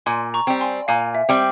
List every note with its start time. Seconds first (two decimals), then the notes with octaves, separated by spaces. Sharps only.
0.06 A#2 G#5 C6
0.34 A#5 C#6
0.47 G3 C4
0.60 G#5 C6
0.88 A#2 F5 G#5
1.15 E5
1.29 G3 C4